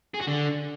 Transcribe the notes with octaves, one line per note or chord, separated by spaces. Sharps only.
G#4
F#4
D3